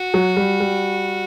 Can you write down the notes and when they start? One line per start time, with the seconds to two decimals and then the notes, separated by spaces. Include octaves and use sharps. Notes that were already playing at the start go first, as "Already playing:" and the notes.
Already playing: F#4
0.14 F#3
0.37 G3
0.60 G3